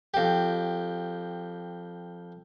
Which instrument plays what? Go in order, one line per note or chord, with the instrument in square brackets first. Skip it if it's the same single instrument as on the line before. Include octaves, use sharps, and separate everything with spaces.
[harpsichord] F2 G4